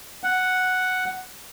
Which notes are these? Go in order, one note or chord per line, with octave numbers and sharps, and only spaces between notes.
F#5